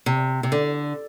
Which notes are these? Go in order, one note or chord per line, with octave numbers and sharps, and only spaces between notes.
C3
C3
D3